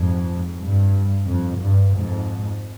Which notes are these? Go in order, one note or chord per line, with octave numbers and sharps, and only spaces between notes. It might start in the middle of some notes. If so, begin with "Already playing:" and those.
Already playing: F2 G#2
G2
F2
G2
F2 G#2